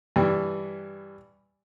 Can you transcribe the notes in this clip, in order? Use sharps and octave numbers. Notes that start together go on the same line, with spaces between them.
G2 E3 G3